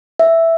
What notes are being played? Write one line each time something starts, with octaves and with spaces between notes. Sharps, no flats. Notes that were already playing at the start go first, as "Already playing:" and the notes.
E5